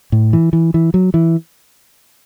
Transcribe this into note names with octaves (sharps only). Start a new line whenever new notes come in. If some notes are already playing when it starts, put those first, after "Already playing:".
A2
E3
E3
E3
F#3
E3